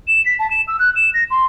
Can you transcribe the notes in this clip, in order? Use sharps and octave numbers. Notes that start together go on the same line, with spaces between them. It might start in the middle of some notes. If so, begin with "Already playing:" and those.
E7
B6
A5
E7
E6
F#6
E7
A#6
C6